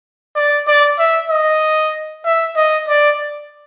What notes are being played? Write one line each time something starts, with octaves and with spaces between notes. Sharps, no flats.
D5
D5
E5
D#5
E5
D#5
D5